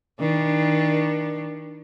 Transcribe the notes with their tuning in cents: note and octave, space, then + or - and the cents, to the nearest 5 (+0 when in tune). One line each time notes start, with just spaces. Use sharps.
D#3 +35 D4 +20